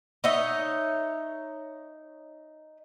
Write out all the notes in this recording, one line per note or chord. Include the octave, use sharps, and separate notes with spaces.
D#4 C#5 D#5 E5